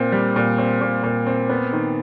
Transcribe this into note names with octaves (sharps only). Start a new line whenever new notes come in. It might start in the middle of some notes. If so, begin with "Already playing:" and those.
Already playing: A#2 C4
G3
A#2
C4
A#2
A#2
C4
B3
D#3